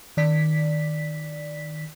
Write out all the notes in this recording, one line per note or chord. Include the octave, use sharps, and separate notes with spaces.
D#3 D5 B6